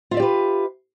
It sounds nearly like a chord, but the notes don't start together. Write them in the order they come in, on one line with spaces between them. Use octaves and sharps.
F4 E5 D5 G4 B4